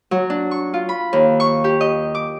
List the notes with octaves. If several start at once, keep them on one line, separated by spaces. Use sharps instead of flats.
F#3
D4
C#6
F4
B5
D#2
C#6
G4
D#5
D6